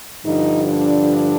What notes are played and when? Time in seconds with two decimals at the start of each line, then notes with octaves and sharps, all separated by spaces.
0.24 G2 D3 F3 D#4
0.67 D4